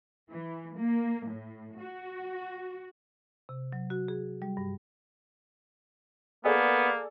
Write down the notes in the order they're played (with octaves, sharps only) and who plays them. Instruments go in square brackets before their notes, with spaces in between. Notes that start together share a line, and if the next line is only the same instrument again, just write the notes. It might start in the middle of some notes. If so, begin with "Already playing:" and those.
[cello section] E3
A#3
A2
F#4
[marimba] C3
F#3
F#4
G#4
G3
G2
[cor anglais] A#3 [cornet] B3 [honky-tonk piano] G#4 A4 D5